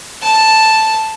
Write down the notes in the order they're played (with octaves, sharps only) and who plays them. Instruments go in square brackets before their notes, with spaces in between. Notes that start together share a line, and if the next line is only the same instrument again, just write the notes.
[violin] A5